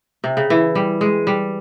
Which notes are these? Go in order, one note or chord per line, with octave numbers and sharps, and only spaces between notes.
C3
C#3
E3
G3
G#3
G3